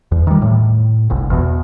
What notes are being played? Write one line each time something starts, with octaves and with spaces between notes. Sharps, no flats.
E2
D#3 G3
A2
G1 C2
E2 B2